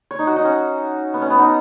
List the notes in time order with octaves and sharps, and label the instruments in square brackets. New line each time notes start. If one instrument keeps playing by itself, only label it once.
[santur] C#5
D#4
F#4
D#4
C#4
B3
C#4
B3
D#4